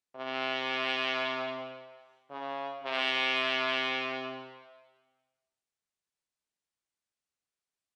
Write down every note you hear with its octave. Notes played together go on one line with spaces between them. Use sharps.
C3
C#3
C3